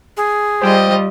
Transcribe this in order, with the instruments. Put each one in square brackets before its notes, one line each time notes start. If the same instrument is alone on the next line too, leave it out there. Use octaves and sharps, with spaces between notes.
[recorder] G#4
[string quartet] G3 [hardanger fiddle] F4 D#5 [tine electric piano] C5 G5